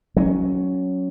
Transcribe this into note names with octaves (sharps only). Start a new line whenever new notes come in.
F#3 C4 C#4